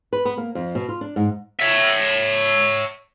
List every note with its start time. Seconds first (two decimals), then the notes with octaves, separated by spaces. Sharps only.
0.13 B4
0.25 B3
0.37 A#3
0.55 F2
0.75 B2
0.89 F4
1.01 D4
1.16 G#2
1.60 C#5 E5